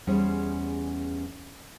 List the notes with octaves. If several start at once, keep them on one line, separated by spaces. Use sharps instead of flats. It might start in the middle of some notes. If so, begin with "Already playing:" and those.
E2 G3 C#4 G#4 C5